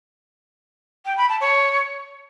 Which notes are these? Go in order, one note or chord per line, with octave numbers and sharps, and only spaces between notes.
G5
B5
A5
C#5